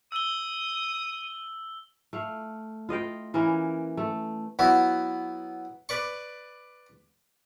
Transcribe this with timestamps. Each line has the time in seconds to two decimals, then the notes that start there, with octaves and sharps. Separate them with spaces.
0.12 D#6 E6 G7
2.13 A3 F5
2.89 F4 D#5 F5 G5
3.34 E3 A#3 C#4 A#4
3.97 A3
4.59 F#3 B3 E4
5.89 B4 D5 C#6